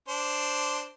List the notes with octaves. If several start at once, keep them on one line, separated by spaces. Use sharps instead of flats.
D4 C5